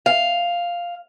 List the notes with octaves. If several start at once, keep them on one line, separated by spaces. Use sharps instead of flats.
F5